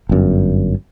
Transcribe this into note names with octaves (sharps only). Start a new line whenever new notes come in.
G1 F#2